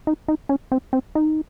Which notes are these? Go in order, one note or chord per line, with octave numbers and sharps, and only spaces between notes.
D#4
D#4
C#4
C4
C4
D#4